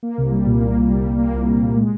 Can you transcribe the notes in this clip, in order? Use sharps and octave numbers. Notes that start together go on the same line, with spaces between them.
A#3
C2
G3
A#2
A#3
C2
G3
A#2
A#3
C2
G3
A#2
G#3